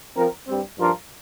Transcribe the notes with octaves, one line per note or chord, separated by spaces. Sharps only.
F3 C4 A#4
G2 G3 C4
G2 F3 D4 F4 A#4